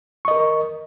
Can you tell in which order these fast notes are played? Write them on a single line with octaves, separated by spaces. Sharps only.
C#6 D#5 A#4